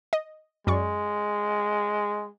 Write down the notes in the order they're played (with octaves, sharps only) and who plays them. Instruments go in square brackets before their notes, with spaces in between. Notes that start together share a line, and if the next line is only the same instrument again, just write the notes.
[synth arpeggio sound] D#5
[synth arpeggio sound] F#2 D5 C#6 [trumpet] G#3